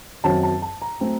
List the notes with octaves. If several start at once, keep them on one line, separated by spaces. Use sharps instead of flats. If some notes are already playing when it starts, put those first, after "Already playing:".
F#2 D#3 F#3 C4 A5
A5
A5
A#5
F#3 A3 C4